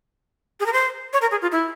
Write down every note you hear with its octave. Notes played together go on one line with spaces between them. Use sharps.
G#4
A#4
C5
C#5
A#4
G#4
F4
E4